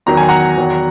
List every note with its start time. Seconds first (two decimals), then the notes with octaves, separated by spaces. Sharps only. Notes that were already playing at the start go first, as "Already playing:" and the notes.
0.06 E2 D#3 F#3 A#5
0.17 G#5
0.29 F#5 A#5
0.58 E2 D#3 F#3